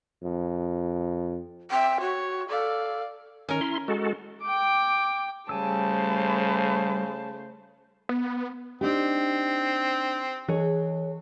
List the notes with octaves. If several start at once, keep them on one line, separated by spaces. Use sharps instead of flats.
F2
C4 E5 G5
F#4 C#5
A4 D5 F5
D#3 C#4 A#4
E4 C6
G#3 F#4 A4
G5 D6
C#3 G3 A3 C5 G#5 A5 E6
B3
C4 D4 D#4 G4
E3 G#4 C#5